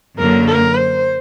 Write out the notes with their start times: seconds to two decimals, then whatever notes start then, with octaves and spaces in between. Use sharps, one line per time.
0.18 F#2 D3 F#3 A#3 A#4
0.47 A#4
0.75 C5